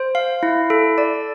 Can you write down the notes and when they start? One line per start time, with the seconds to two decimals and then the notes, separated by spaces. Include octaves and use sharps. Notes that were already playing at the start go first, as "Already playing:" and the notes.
Already playing: C5
0.15 F5
0.43 E4
0.70 A4
0.98 D5